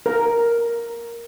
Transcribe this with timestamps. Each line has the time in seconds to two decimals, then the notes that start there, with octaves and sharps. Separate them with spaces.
0.06 A#4